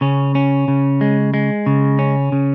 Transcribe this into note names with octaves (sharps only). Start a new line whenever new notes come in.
C#3 C#4
C#4
C#3
G#3
G#3
C#3
C#4
C#3